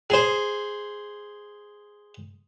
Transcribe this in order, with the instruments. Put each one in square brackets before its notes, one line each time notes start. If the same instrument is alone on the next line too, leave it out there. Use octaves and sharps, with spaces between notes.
[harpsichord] G#4 C5